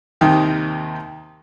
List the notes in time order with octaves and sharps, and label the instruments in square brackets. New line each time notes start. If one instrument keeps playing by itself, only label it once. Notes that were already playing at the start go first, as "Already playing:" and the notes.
[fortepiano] D#2 C3 D#3 D#4 G4